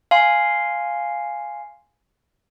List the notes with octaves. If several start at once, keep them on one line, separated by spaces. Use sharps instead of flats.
F5 G#5 C6